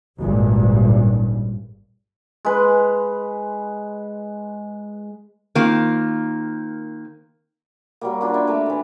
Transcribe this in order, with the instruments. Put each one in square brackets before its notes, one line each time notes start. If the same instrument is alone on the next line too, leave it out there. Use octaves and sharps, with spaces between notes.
[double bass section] G#1 C#2 G2 A#2
[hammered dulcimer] G#3 B4
[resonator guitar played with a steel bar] D#3 A#3 C4 F4
[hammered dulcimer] F#3 G3 A#3
A#3 D4 F4 F#4
D4 E4 E5
A3 C4 A#5 D6
A2 E3